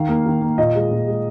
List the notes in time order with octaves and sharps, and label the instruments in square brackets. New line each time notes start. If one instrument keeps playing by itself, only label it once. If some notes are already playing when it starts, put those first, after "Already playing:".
Already playing: [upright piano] D#3 F5
A#3
D#3
A#3
A#2 D#5
G#3
A#2
G#3